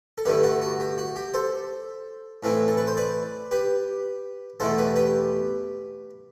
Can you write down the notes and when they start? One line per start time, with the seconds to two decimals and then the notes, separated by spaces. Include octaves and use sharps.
0.18 A4
0.25 G2 D3 A3 E4 G4 B4
0.43 F#4 A4
0.62 F#4
0.80 G4
0.98 F#4
1.16 G4
1.34 A4 C5
2.43 A2 E3 A3 C4 E4
2.68 A4
2.77 B4
2.87 C5
2.97 B4 D5
3.51 G4 B4
4.60 E2 B2 A3 E4 A4 C5
4.78 G4 B4
4.96 G4 B4